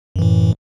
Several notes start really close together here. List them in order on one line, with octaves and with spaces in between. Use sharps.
F#2 E3 A2